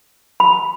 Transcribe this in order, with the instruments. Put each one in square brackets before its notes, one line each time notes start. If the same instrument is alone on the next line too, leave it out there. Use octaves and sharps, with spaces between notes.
[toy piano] B5